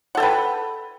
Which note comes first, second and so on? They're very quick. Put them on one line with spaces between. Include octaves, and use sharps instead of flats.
F#5 A4 G5 B4